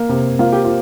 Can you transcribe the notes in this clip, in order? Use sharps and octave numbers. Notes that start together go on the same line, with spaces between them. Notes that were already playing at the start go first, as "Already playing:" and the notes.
Already playing: A#3
C3
A#3 F4
G4
F4